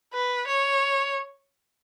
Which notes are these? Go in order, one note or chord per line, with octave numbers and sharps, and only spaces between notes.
B4
C#5